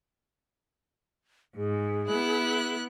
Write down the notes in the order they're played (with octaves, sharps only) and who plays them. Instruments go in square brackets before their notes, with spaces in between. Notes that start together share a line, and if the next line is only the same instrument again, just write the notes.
[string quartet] G#2 [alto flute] G#4
[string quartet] B3 E4 F#6